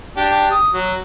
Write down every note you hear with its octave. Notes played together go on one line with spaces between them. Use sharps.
D4 G4
D#6
F#3